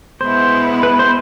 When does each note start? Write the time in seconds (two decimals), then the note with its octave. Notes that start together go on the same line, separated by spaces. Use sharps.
0.21 B2 G#3 B3 E4 C5
0.83 B4
0.99 C5